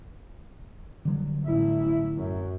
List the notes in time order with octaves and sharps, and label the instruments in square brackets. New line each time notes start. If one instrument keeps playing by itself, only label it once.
[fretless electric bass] D3 F#3 G3
[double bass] A1 E4
F#2